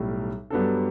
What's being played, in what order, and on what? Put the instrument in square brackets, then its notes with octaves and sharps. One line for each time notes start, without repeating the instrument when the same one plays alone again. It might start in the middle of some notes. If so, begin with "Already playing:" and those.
Already playing: [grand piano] B1 A2 G3
G2 F#3 B3 D4 A4